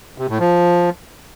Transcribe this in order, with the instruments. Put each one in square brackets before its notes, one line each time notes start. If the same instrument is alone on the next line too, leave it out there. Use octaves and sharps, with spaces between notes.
[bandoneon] C3
A2
F3